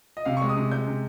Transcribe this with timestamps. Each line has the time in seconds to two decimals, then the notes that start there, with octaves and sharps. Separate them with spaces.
0.17 D#5
0.25 C3 F5
0.37 C#6
0.42 G#3
0.49 D#6
0.57 C3
0.71 G#3 G6
0.88 C3